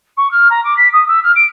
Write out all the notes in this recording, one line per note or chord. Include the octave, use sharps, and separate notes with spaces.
C#6
F6
A#5
D6
B6
D#6
E6
F6
D7